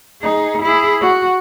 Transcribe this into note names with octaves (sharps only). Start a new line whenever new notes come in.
D#4 G#4
E4 G#4
F#4